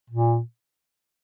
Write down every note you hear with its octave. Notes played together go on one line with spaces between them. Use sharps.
A#2